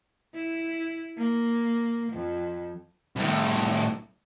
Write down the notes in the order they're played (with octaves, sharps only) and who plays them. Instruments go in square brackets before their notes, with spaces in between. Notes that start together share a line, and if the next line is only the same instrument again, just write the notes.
[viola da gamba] E4
A#3
F2
[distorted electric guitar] C2 A2